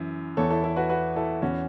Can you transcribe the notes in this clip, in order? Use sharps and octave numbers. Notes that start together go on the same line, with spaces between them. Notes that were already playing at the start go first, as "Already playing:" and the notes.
Already playing: F#2 E3
E2 E3 A4 C#5
E4 A4
E4 A4
F#4 B4
F#4 B4
E4 A4
E2 E3 C#4 F#4